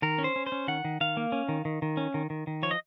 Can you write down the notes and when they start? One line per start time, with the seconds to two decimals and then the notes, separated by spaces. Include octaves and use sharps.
0.02 D#3 A#4
0.18 C#4
0.24 C5
0.36 C#4
0.46 C5
0.52 C#4
0.68 D#3 F#5
0.85 D#3
1.01 D#3 F5
1.17 A#3
1.32 C#4
1.49 D#3
1.65 D#3
1.82 D#3
1.97 C#4
2.14 D#3
2.30 D#3
2.47 D#3
2.63 F3 C#5
2.71 D#5